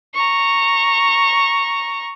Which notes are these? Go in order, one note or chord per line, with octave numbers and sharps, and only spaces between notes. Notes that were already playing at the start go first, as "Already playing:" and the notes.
A#5 C#6